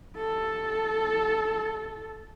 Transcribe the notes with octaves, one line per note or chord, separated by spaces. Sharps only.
A4